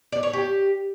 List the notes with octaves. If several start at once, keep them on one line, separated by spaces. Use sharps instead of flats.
D5
C#5
G4